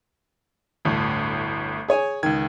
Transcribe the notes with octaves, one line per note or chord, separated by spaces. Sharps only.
G1 D2 A2
G#4 C#5 G#5
C#2 D#3 G#6